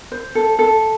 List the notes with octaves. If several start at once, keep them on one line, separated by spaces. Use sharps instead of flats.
C5
A4
A4